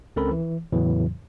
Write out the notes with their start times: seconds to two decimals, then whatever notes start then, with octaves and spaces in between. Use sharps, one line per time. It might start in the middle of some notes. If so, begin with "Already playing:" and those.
0.16 C#2 C4 C#4 A4 A#4 B5
0.31 E3
0.72 E2 A2 C#3 E3 F#3